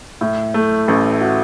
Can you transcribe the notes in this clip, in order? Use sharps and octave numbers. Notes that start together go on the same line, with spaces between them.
A2
A3
A1
F#4